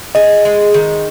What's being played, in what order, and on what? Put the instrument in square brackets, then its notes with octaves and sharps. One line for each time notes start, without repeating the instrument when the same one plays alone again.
[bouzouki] G#4 [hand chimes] D#5
[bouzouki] G#3
D#3